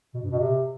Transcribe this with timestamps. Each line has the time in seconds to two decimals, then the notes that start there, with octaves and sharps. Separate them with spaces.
0.14 B2
0.23 G2
0.31 B2
0.40 C3